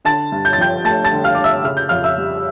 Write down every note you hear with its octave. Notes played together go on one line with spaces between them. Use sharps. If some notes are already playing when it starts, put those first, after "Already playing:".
D3 A5 A6
G2
G6
A6
F3 G5 G6
A3 A5 A6
A5 A6
D3
F5 F6
G2 D6
E5 E6
C#3 F6
G6
F2 F5 F6
E5 E6
G3